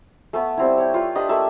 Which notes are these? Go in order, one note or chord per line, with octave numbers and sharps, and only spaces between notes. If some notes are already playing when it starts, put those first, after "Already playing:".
A3 B3 B5
G3 C4 E4
C#5 G5
F4 B4
D4 G4 B4 D#5
A3 A#3 E5